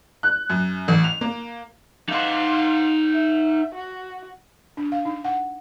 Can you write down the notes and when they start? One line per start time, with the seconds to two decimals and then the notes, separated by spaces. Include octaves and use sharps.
0.23 F#6
0.50 F#2
0.88 A1
1.04 F7
1.21 A#3
2.09 D#4 F5 F#5 C6
3.13 E5
3.74 F#4
4.77 D4
4.92 F5
5.05 D#4
5.24 F#5